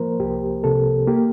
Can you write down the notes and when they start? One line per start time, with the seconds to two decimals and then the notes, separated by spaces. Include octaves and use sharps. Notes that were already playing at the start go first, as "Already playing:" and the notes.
Already playing: F3 A#3 A#4 C5
0.20 C2 G4
0.64 C3 A4
1.07 A#3 G4